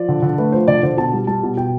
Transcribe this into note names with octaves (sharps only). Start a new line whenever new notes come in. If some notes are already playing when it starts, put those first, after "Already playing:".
Already playing: F3 D5
D3
D3
A3 B4
F3 C5
D3 D5
D3 C5
B2 A5
G3
G3 A5
B2
B2 G5